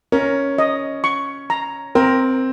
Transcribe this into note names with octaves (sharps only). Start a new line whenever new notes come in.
C#4 A#4
D#5
C#6
A#5
C4 A#4